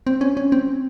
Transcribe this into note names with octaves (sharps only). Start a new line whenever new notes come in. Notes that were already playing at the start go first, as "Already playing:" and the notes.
C4
C#4
C#4
C4